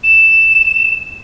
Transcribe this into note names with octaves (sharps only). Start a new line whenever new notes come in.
E7